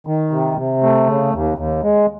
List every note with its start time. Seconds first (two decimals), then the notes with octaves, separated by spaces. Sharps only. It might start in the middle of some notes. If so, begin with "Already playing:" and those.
0.07 D#3
0.31 C3
0.58 C3
0.83 A3
1.07 C#3
1.33 D#2
1.58 D#2
1.83 G#3